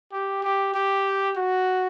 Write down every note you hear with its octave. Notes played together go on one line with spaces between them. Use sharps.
G4
G4
G4
F#4